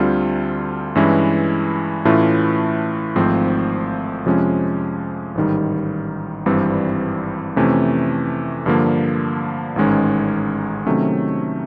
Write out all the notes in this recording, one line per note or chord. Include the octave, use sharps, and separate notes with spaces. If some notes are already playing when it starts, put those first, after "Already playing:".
Already playing: D2 D3 G3 C4 F4
G2 E3 G#3 C#4 E4
A2 E3 A3 C#4 F4
G#1 G#2 F3 A3 C4
F2 C3 F3 G#3 C#4
A1 G#2 D#3 G3
G#1 G2 E3 G3 C4
F2 C3 E3 A3 C#4
G2 D3 F3 A#3
A1 G#2 D#3 G#3 C#4
C3 D#3 F#3 A3 C#4